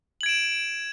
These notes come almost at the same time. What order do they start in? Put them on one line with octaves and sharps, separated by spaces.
F#7 G#6 D7 E7